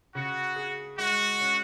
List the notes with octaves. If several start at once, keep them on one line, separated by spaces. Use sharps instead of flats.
C#3 F#4
G#4
G#3 F#4
C#4